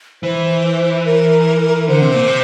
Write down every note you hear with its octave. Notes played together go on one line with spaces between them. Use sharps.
E3 C5
A#4
D3 C5
C3
A#2
C3